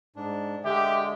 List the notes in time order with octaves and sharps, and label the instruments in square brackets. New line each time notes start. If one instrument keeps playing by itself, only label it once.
[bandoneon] G#2 D4
[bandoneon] D3 G#3 [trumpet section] G4 [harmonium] E5